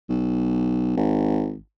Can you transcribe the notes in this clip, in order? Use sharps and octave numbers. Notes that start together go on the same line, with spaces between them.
B1
G#1